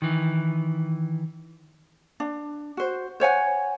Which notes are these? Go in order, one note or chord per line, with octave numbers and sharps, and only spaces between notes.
D#3 E3
D4
F#4 C5
C5 C#5 F#5 G#5